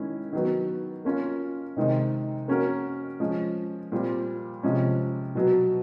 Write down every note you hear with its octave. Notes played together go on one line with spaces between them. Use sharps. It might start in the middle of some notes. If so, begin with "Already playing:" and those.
Already playing: D#3 G#3 C#4 E4
D#3 F#3 B3
A#3 C#4 F4
C3 D#3 G#3 C4 D#4
A#3 C#4 F#4 A#4
F3 G#3 C#4
A#2 G3 C4
C3 F3 G#3 C#4
B2 F#3 B3